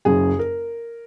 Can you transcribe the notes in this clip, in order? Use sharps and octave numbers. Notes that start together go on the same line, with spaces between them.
F#1 F#2 C#3 G#4
A#4